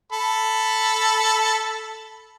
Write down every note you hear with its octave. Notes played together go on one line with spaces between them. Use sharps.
A4 B5